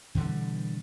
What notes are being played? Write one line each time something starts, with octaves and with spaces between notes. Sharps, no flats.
B2 D3 E3 G3